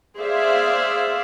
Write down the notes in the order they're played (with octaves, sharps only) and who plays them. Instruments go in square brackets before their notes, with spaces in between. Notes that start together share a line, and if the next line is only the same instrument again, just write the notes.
[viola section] G#4 C5 D5 E5 F5